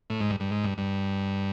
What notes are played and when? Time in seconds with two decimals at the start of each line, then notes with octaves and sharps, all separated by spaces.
0.10 A2
0.20 G#2
0.30 G2
0.40 G2
0.51 G#2
0.64 G2
0.78 G2